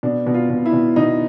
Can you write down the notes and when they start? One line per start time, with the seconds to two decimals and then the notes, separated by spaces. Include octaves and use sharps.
0.03 B2 D4
0.27 B2
0.34 F4
0.50 B2
0.66 E4
0.73 B2
0.96 B2 D#4